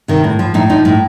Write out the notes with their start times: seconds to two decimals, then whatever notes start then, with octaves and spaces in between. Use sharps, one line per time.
0.08 C3 D#3
0.24 A2
0.39 F3
0.54 A2 D#4
0.70 F3 D#4
0.85 A2